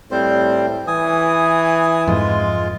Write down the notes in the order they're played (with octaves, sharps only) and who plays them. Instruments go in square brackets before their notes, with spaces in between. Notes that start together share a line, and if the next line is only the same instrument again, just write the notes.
[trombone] A2 [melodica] G3 C4 C5
[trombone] E3 [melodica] G#5 D#6
[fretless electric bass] F2 G#2 [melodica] G#3 F4